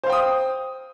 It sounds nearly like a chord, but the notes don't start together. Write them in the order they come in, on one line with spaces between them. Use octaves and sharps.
C5 F5 G5 D#6